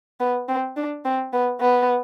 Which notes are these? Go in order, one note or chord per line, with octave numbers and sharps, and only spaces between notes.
B3
C4
D4
C4
B3
B3